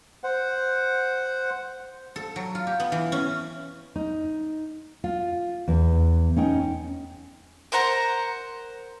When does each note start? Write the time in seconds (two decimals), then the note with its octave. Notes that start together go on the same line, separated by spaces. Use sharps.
0.24 C5 F#5
2.16 A4
2.36 F#3
2.55 F4
2.67 G4
2.80 B3
2.92 E3
3.12 C#4
3.96 D#4
5.04 F4
5.68 E2
6.36 C#4 D#4 G5
7.72 A#4 C5 F#5 A#5